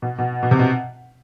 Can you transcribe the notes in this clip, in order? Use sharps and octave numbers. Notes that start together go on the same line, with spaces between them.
B2
B2
B2
C3
B2